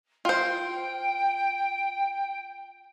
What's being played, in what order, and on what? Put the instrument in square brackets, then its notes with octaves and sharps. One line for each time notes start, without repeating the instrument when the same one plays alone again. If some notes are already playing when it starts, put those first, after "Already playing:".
[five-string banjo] F4 C5 [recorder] G5